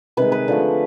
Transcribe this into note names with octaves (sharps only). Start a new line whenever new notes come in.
C3 D#3 G#3 B4
B4
D3 F3 A3